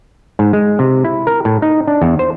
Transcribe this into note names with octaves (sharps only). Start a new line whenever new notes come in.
G#2
G#3
C3
E4
A#4
A2
D#4
D4
E2
C5